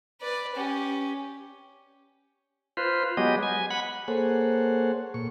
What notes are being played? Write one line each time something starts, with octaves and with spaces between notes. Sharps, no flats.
B4 D5
C#4 G4
F4 B4 C5
F#3 G#3 B3 G4 D#5
G#5
F#5 B5
A#3 G#4 A4 C5 C#5 F#5
A#2 C#6